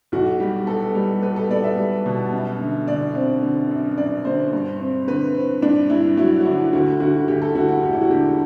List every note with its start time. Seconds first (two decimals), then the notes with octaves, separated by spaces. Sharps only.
0.12 B1 F#4
0.40 G3 G4
0.67 B3 A4
0.95 G3
1.22 B3 B4
1.36 A4
1.51 B3 D5
1.64 E5
1.78 G3
2.06 B2
2.33 F#2
2.61 D3
2.87 D3 D5
3.15 C4
3.43 D3
3.71 F#2
3.98 F#2 D5
4.25 D3 C5
4.53 G2
4.80 C4
5.07 D3 B4
5.35 C4
5.62 G2 D4
5.90 G2 E4
6.17 F#3 E4
6.41 F#4
6.45 D3 E4
6.73 D2 F#4
7.00 D2 F#4
7.16 F#4
7.28 D2 G4
7.42 A4
7.55 D2 F#4
7.69 F#4
7.83 E1 G4
7.93 E4
8.02 F#4
8.10 D3 G4